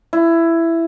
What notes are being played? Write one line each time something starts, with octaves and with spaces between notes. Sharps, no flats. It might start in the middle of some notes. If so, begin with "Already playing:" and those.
E4